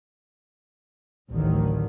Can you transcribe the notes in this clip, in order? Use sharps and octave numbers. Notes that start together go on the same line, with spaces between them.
A1 D2 D3 D#3 F#3